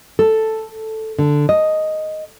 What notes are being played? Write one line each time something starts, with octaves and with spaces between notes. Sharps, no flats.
A4
D3
D#5